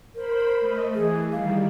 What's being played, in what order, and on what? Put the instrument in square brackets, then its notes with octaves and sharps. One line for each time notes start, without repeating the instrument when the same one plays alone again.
[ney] A#4 [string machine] C5 B5
[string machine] A3 D#5
[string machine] E3 [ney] G#4
[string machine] D#3 G3 [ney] F5